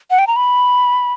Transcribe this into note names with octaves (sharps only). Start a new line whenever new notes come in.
F#5
G5
A#5
B5